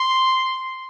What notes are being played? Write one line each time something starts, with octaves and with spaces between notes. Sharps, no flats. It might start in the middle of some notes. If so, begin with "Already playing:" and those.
Already playing: C6